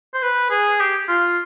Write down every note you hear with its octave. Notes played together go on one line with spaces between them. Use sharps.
C5
B4
G#4
G4
F4